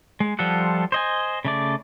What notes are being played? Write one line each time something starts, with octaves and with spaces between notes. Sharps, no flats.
G#3
F3 G3 F4 A4 F#5
C5 D#5 G#5
C#3 A3 D5